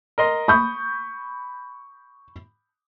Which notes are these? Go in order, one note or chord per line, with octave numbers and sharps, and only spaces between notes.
A#4 D#5 C6
B5 C#6 D#6 G6